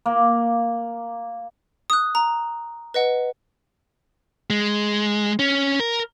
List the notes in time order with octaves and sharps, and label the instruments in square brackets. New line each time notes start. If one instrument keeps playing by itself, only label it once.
[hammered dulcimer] A#3
[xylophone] D#6 F#6
A#5
B4 D#5 F#5
[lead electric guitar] G#3
C#4
A#4